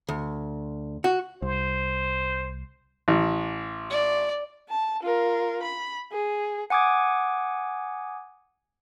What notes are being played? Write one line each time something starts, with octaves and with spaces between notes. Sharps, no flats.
D2
F#4
C2 C5
A1
D5
A5
F4 A#4
B5
G#4
F#5 G#5 D6 D#6 G#6